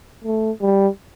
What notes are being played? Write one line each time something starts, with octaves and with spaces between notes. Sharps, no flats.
A3
G3